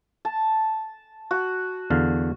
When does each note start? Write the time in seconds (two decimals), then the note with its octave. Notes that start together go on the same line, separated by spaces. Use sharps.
0.25 A5
1.31 F#4
1.90 E2 D3 F5